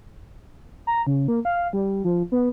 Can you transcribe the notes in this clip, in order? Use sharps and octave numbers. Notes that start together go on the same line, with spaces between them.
A#5
C#3
A#3
F5
G3
F3
B3